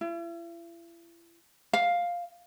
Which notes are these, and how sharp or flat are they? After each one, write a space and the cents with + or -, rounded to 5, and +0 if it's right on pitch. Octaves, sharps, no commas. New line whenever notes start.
E4 +40
F5 +5